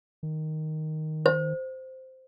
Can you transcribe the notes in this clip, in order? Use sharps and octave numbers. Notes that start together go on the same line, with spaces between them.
D#3
C5